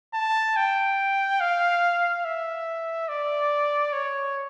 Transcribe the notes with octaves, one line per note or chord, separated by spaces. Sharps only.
A5
G5
F5
E5
D5
C#5